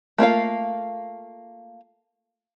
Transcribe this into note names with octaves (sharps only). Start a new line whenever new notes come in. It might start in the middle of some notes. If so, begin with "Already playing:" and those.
A3 A#3 F4 F5